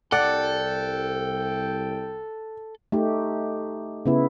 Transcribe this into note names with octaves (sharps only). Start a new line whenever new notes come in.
C2 A4 D5 F#5 G5
A3 D#4 G4
C#3 B3 E4